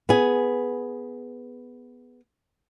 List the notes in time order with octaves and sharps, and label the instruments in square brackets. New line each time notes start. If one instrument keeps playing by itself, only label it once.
[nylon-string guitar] B3 G#4